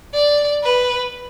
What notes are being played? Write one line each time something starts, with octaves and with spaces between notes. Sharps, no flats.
D5
B4